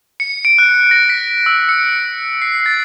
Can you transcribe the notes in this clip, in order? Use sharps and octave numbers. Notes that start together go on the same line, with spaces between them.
C#7
D7
F#6
A#6
B6
E6
C#7
C7
A6